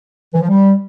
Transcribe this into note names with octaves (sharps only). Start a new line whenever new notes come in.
E3
F3
G3